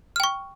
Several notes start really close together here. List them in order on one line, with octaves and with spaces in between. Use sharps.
F6 G5 C#6